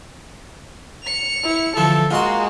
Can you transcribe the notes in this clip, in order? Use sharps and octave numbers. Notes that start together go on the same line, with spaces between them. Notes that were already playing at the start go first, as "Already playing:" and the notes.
C#7 F7
E4
D3 E3 F3 A4
G#3 A#3 F4 F#4 C6